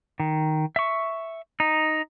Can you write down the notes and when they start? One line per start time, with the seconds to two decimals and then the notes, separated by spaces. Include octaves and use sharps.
0.20 D#3
0.76 E5 C#6
1.60 D#4